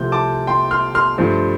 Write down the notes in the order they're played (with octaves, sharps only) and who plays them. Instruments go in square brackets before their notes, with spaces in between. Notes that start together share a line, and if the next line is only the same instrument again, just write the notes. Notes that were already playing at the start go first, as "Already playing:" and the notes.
Already playing: [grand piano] C2 C3 F3 A3 C4 G6
A5 D6
G5 C6
C6 F6
C6 F6
G2 F3 A3 C4